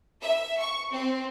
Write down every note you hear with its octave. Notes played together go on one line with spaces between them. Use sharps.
E5
C#6
C4